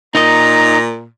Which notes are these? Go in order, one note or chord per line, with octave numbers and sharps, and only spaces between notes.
A#2 D#4 D#5 A#5